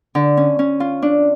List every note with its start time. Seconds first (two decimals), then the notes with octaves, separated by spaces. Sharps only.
0.15 D3
0.37 C#4
0.59 C#4
0.80 F4
1.02 D4